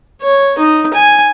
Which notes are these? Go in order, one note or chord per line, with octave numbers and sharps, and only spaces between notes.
C#5
D#4
G#5